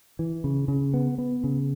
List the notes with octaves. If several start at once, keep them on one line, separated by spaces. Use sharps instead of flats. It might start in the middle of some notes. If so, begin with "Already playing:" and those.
E3
C#3
C#3
B3
B3
C#3